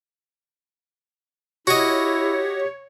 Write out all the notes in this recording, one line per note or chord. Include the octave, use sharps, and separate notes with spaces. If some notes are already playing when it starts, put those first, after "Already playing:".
E4 F#4 G4 C#5 D#5